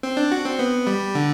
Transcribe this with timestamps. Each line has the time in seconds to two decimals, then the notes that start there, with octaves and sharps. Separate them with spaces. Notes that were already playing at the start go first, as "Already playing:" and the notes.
0.03 C4
0.17 D4
0.32 F#4
0.45 C4
0.59 B3
0.87 G3
1.15 D3